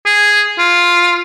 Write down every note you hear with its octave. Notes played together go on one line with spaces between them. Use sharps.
G#4
F4